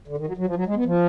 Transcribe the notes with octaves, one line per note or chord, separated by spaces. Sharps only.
D3
D#3
F#3
F#3
F3
F#3
G#3
B3
F3